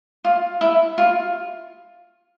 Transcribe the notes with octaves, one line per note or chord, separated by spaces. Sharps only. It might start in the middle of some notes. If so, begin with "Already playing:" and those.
F4
E4
F4